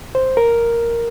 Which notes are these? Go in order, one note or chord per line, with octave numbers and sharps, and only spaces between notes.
C5
A#4